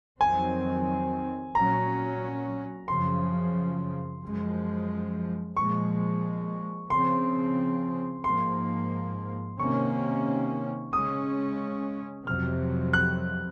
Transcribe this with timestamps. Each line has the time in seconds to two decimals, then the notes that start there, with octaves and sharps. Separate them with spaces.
0.20 F2 D#3 F#3 C4 G#5
1.54 A#2 F#3 C#4 A#5
2.88 F#2 C#3 F3 C6
4.22 F#2 F3 G#3
5.56 A#2 F3 G#3 C#6
6.90 C#3 F3 C4 C6
8.24 G#2 F3 A#3 C6
9.59 C3 D#3 A#3 C#4 C#6
10.93 C#3 G#3 C#4 D#6
12.26 F2 C3 F#3 F6
12.93 F#6